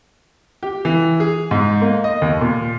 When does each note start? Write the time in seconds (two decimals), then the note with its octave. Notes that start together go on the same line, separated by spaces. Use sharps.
0.63 G4
0.85 E3
1.20 G#4
1.51 G#2
1.82 A#3
2.04 D#5
2.21 D#2
2.41 A#2